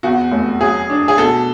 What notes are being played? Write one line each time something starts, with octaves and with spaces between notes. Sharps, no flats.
E2 F#4
F1
F#3 G#4
D4
G#4
B2 A4